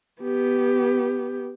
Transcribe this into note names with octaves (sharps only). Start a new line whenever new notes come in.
B3 G4